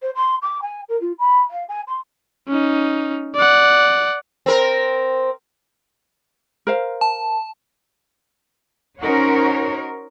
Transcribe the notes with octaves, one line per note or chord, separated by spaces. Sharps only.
C5
C6
D6
G#5
A#4
F4
B5
F5
G#5
C6
C#4 D#4
D5 F#5
C4 A#4
A#4 C5 F5
A5
C#4 D#4 F#4 A#4 C5 C#5